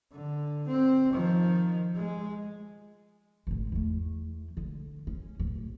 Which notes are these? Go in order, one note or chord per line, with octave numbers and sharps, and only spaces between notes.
D3
C4
D#3 F3
G#3
G#1 D2
E2 A3
D3
C#4
D1